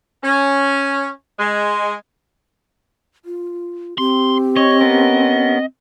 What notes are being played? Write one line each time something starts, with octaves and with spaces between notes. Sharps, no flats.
C#4
G#3
F4
C4 G4 C6
C#5 D#5
B3 C#4 A#4